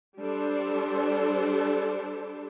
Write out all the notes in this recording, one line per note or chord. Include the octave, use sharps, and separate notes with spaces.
G3 D4 A4 C5